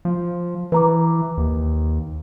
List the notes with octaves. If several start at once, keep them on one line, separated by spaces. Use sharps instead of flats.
F3
E3 B4 A#5 D6
D#2